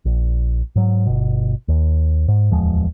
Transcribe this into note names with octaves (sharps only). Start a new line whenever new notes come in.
A#1
G#2 F#3
G1 B2
D#2
G#2
D1 E2 F3 G#3